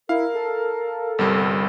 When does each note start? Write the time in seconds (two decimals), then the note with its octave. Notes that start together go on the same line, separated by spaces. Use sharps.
0.09 E4 A#4 F5
0.35 A4
1.19 G1 C2 G3